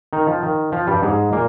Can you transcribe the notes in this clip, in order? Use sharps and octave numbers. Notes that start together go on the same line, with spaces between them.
D#3 D#4
F3
D#3
F3
G2 G3
G#2 G#3
A#2 A#3